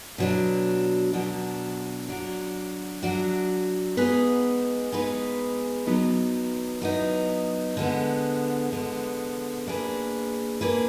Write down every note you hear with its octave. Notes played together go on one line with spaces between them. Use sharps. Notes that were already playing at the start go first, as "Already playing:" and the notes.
B2 F#3 D4
B2 F#3 D4
F#3 D4 F#4
F#3 D4 F#4
G#3 B3 D#4 G#4 B4
G#3 B3 D#4 G#4 B4
F#3 B3 D#4
F#3 B3 D#4
D3 G#3 B3
D3 G#3 B3
A#3 D4 G#4 B4
A#3 D4 G#4 B4